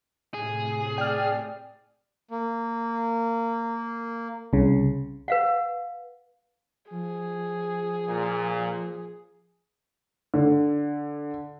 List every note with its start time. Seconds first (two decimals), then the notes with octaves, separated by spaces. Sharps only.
0.34 A2 C3 G#4
0.98 D5 G5 F6
2.31 A#3
4.53 C2 C#3
5.28 B4 F5 F#5
6.91 F3 G#4
8.08 A#2
10.34 D3